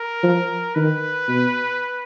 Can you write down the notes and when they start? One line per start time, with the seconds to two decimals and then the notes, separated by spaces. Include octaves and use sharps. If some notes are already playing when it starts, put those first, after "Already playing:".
Already playing: A#4
0.23 F3
0.75 D#3 B4
1.28 B2